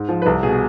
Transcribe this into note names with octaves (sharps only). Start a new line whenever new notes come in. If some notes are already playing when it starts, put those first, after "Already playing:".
Already playing: G#2
F3
B4
C2 A4
B2 G#4